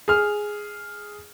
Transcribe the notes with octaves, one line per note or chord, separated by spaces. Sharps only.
G#4 F6